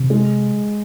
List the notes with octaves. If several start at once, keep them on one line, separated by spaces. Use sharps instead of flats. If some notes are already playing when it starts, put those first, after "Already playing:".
Already playing: C3
G#3